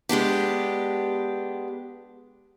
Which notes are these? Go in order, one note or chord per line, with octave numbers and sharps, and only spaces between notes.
G#3 B3 D4 G4